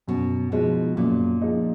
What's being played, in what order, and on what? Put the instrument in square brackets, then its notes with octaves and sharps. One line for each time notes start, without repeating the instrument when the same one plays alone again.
[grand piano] F#2 [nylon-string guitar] B2
[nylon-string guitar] B2 [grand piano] F3 G#3 D#4
[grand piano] F#2 [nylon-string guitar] A#2
[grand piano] F3 G#3 D#4